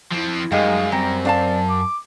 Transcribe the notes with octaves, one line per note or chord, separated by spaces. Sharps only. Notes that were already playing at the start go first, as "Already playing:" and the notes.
F3 C4 E4
F#2 G3 G#3 D#4 F5
G3 C4 A#5
D4 D5 F5 A5
D6